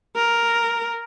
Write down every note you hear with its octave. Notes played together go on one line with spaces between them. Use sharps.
A#4